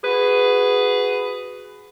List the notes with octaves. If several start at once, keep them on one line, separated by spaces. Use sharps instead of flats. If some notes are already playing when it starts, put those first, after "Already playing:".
F#4 G#4 B4